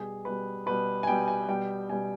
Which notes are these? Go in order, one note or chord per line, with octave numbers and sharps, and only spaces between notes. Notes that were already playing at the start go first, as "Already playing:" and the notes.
Already playing: B2 G3 G#4
B2 G3 B4
B2 G3 B4
G#5
B2 G3 G5
G#5
B2 G3 G5
B2 G3 G#5